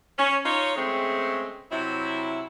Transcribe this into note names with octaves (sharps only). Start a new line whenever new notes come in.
C#4
D#4 F4 C#5
C#3 G#3 A3 C4
C3 F#3 E4